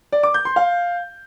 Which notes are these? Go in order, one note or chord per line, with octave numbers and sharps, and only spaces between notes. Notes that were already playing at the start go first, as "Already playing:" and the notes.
D5
D6
G6
C6
F5